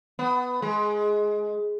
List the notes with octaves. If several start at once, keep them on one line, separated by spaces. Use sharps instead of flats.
B3
G#3